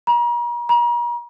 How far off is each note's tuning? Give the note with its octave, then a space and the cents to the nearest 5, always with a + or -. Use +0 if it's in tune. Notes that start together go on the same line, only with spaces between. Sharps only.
A#5 +40
A#5 +40